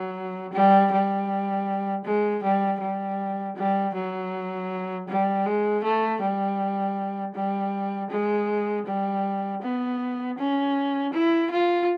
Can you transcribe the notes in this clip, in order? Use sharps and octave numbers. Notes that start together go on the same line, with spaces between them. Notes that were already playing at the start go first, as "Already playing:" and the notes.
Already playing: F#3
G3
G3
G#3
G3
G3
G3
F#3
G3
G#3
A3
G3
G3
G#3
G3
B3
C#4
E4
F4